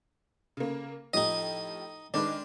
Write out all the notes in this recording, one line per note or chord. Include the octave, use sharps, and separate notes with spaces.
C#3 A#3
A2 F3 D#4 G4 D#5
D#3 G#3 D4 B4